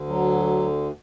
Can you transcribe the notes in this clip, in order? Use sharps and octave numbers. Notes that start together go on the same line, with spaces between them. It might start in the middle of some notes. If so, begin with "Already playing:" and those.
Already playing: D2 D3
F#3